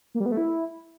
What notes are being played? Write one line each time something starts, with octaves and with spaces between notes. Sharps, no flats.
A#3
G3
B3
A3
E4